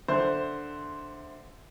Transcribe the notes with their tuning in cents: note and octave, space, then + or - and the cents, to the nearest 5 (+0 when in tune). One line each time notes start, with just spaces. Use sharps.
D3 +0 C5 +0 E5 +0